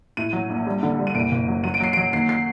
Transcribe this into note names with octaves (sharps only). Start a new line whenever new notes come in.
A2 D#7
F#3
A#1
G3
D3
G3
D#7
F#1 D7
F#1
F#3
F#3 D#7
D7
F#3 C7
D7
F#3
D#2 C7
C7